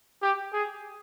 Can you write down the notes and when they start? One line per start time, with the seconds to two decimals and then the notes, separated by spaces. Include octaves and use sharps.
0.22 G4
0.53 G#4